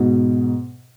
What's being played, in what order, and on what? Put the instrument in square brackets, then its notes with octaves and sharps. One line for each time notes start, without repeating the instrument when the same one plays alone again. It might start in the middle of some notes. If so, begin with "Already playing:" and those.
Already playing: [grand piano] G#2 B2